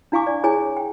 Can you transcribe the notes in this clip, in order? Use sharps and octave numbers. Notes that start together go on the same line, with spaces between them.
D4 E4 F5 G#5 C#6 D6
D5
E4 G#4 C#5 G#5
G5